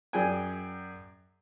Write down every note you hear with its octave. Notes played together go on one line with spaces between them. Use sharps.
F#2 G#4 D5 G5 G#5